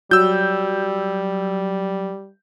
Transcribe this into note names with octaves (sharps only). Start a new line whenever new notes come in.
F#3 G3 E6 G6